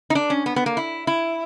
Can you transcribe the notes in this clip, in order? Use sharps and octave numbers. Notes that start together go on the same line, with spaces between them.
D#4
D4
C#4
B3
B3
A#3
E4
E4